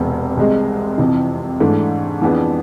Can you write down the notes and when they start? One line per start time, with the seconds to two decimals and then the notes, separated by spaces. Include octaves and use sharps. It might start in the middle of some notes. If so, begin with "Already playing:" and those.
Already playing: E1 E2 C3
0.37 C2 C3 G#3
0.98 F2 C3 E3
1.60 G#2 E3 A3 D4
2.21 F2 E3 B3 D4 G#4